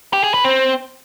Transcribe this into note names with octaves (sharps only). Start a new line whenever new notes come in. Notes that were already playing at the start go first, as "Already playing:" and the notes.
G4
G#4
B4
C4